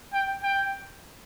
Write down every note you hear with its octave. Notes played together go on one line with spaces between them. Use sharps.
G5
G5